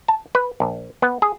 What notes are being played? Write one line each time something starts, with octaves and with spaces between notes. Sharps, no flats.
A5
B4
A#1
B3
G#4